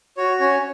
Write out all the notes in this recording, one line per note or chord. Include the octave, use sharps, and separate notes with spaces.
F#4 C#5
C#4 C#5